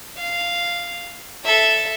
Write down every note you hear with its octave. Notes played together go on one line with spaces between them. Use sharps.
F5
A4 E5